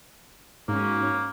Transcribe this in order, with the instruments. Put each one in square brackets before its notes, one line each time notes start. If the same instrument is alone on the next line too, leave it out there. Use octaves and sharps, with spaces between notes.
[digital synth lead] G#2 [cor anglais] A#3 [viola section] C#4 F#4